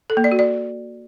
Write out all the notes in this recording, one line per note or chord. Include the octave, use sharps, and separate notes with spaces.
A4
A#3
D5
F#4
D5